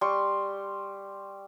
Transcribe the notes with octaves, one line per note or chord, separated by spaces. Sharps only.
G3 C6 C#6